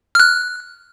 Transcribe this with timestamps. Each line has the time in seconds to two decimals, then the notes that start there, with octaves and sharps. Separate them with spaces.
0.15 F6 F#6